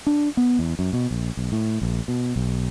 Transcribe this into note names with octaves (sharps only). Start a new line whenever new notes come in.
D4
B3
E2
F#2
B2
A#1
B1
A2
A#1
B2
B1